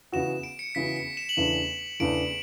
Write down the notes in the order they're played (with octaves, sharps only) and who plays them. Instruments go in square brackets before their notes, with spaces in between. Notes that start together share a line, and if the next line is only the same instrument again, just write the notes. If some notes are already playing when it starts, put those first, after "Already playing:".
[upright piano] C#3 E3 B3 F#4 [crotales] E7
[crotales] D7
C#7
[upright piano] C#3 E3 B3 F#4 [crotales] B6
[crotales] C#7
E7
F#7
[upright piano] E2 C#3 E3 A3 D4 [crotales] E7
[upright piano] E2 C#3 E3 A3 D4 [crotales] D7